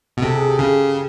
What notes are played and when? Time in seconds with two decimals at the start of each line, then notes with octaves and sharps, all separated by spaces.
0.17 B2
0.22 C3 A4
0.36 G#4
0.48 G4
0.59 C#3 G#4